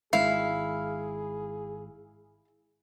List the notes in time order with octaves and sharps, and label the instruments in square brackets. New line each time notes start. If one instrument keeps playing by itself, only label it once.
[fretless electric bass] G#1 G#3 [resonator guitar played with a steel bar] E4 [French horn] G#4 [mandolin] F5